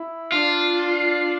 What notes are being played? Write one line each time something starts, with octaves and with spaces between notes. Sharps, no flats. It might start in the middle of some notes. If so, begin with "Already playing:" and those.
Already playing: E4
D4 F4